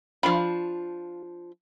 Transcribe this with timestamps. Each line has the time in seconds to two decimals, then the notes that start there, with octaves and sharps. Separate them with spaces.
0.23 F3 D4 F4 B5